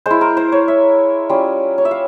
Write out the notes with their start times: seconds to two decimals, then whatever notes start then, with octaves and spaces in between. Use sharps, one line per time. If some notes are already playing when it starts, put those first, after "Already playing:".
0.06 G#3 E4 C5
0.21 A#4
0.37 C5
0.52 C#5
0.68 E5
1.29 G3 C#4 F4
1.78 C#5
1.85 E5
1.91 F5